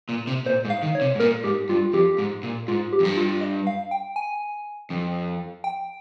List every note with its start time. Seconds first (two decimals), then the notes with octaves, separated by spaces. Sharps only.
0.09 A#2
0.27 C3
0.46 A#2 C5
0.65 G#2
0.70 F5
0.83 D#3
0.95 C#5
1.01 C3
1.15 G#2
1.20 A#2 A#4
1.44 G#2 G4
1.69 G2 F4
1.93 F2 G4
2.18 G#2
2.43 A#2
2.68 G#2 F4
2.93 G4
3.00 F2
3.05 G2
3.17 F4
3.41 D#5
3.67 F5
3.91 G5
4.16 G#5
4.90 F2
5.64 G5